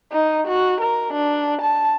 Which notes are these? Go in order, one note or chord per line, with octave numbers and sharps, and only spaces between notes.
D#4
F#4
A#4
D4
A5